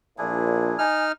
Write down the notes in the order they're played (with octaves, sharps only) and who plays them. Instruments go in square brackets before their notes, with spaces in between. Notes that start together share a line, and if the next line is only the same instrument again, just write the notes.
[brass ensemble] A#1 A#2 [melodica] D4 E4 G#4
[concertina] D#4 F6 [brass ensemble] G#5